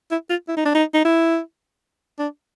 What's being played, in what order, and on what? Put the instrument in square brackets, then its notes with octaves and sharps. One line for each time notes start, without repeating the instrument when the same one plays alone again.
[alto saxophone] E4
F4
E4
D#4
D4
D#4
D#4
E4
D4